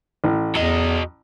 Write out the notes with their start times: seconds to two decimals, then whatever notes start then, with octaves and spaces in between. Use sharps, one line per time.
0.24 A1
0.55 E2 F#3 D#5